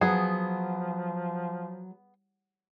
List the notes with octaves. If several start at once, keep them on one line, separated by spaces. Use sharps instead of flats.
F3 F#3 B3 G#4